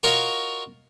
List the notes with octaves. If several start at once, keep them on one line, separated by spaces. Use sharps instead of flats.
F4 F#4 A#4 C#5 D#5 F5